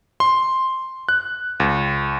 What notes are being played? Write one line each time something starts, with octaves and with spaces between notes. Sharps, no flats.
C6
F#6
C#2